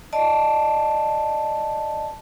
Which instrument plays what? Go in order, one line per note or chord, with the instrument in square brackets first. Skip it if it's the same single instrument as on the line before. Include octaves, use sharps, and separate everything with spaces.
[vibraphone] D5 D#5 A5